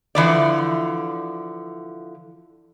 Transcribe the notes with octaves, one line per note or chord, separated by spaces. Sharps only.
D3 E3 F3 D5